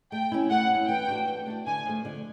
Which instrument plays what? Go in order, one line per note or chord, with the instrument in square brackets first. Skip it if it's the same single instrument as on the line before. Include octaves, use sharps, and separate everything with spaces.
[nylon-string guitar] A3 [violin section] G5
[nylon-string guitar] C#4 E4
[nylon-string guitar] A3 [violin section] F#5
[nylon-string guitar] C#4 E4
[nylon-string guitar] E3 [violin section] G5
[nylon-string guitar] A3 D4 F#4
E3
A3 D4 F#4
[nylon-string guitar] D3 [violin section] G#5
[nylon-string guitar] F3 A3
D3